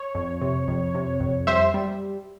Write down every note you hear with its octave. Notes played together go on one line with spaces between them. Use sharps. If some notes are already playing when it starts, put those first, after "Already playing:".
Already playing: C#5
F2
C3
F2
C3
F2
G3 C5 E5
G3